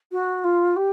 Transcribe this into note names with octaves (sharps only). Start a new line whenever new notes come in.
F#4
F4
G4